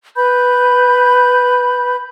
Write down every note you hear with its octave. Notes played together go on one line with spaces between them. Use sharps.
B4 B5 G6